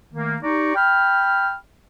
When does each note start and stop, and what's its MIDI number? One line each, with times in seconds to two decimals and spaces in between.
0.14 0.36 51
0.14 0.36 57
0.14 0.36 58
0.42 0.74 63
0.42 0.74 67
0.42 0.74 74
0.42 0.74 82
0.42 0.74 85
0.76 1.54 79
0.76 1.54 83
0.76 1.54 89